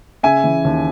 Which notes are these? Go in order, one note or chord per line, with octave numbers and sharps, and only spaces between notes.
C#3 E5 G#5
E3
D#2